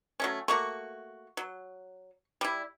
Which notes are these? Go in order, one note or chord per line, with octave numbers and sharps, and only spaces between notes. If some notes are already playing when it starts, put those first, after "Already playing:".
F#3 A3 C#4
A3 A#3 F#4 C#6
F#3
G3 E4